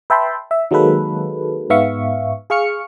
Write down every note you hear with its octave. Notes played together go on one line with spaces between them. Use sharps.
B4 E5 G5 A5 B5 C6
E5
D#3 F#3 G#3 A#3 A4 B4
G#2 B3 E5 F5 C#6
G#4 F5 C#6 F6 C#7